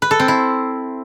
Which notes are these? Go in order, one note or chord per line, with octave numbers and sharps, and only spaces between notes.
B4
A4
C4
E4